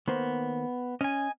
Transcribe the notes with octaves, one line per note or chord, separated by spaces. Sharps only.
D#3 A#3 B3 C5
C#4 D#5 G#5